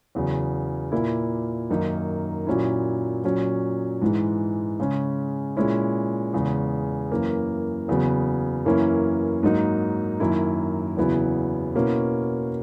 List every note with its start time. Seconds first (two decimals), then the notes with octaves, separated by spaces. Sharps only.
0.15 E2 C#3 F#3
0.92 A#2 A#3 E4
1.70 F#2 D#3 A#3 D#4
2.47 A#2 F#3 C#4 E4
3.24 A#2 F#3 C#4
4.02 G#2 E3 G#3
4.79 C#3 G#3 C#4
5.57 A#2 G#3 C#4 E4
6.33 E2 C#3 G#3
7.11 F#2 E3 A#3 C#4
7.88 E2 C#3 F#3 B3
8.65 F#2 E3 A#3 C#4 E4
9.43 G#2 F#3 A#3 D#4
10.20 F#2 D#3 A#3 E4
10.97 E2 C#3 F#3 B3 E4
11.74 B2 A#3 C#4 E4